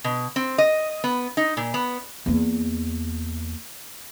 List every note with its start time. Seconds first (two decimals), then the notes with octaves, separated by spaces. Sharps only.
0.04 B2
0.36 C4
0.58 D#5
1.04 B3
1.37 D#4
1.57 A#2
1.74 B3
2.26 E2 A#3